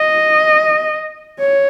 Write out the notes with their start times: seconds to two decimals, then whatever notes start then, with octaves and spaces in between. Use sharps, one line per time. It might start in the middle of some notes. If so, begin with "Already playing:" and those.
Already playing: D#5
1.40 C#5